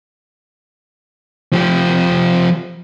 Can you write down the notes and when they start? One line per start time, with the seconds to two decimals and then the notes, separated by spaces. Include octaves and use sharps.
1.53 F3 G4